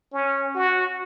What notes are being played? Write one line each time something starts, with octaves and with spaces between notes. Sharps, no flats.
C#4
F#4